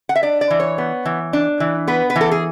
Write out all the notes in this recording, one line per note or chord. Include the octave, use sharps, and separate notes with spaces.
F#5
E5
D4 D5
D5
E3
C#5
B3
E3
D4
E3
B3 B4
B4
E3
A4
G#4